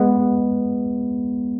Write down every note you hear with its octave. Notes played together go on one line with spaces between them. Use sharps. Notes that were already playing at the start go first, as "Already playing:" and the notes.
Already playing: G#3 B3